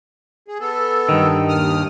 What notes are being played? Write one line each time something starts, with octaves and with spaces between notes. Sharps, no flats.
G#4
B3 A4
G2 D#3
D#2 D#6 F6